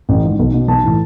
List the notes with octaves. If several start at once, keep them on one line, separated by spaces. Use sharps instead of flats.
A1
G#2 D#3
B1
B2
B1 A5
A2 E3